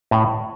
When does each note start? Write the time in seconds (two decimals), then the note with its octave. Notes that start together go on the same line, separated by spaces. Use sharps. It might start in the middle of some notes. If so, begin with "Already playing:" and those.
0.11 A2